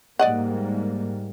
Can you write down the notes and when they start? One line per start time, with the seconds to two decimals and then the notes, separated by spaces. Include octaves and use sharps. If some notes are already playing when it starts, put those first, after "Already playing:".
0.19 G#2 G3 A#3 D5 D#5 F#5